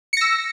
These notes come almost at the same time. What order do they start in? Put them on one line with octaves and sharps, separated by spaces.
C#7 A#6 E6